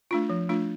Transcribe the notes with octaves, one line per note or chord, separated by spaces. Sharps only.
A3 D4 F4
F3
A3 D4 F4